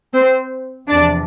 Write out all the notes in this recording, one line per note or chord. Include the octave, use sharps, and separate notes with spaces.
C4 C5
E2 C3 F3 D4 D5